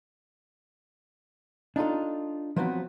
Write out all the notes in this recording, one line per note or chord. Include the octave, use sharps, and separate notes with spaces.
D4 D#4 F4 A4
F3 F#3 B3 C4 D#4 F#4